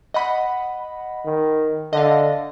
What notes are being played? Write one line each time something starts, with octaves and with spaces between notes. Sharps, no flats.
D#5 F#5 B5
D#3
D3 D#5 F5